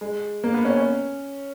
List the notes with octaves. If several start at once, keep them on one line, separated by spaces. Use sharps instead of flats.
G#3
A#3
B3
C#4
C#4